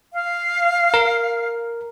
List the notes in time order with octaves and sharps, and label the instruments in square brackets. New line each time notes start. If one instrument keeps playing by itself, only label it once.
[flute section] F5
[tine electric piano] A#4